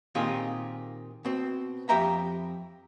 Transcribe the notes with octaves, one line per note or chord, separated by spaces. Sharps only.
A#2 D#3 C4 F4 G4 G#4
B2 C4
F2 G4 E5 G5 A#5 B5